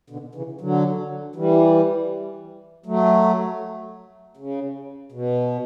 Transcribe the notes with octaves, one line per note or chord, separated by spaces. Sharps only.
B2 D3
C#3 E3
D3 F#3
E3 G3
F#3 A3
C#3
B2